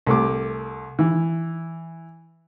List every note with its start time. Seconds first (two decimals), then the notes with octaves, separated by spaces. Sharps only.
0.06 C2 A3 D6
0.99 E3